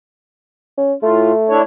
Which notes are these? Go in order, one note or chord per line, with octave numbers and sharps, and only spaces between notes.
C#4
A2 A3 F4
D4 E4 C#5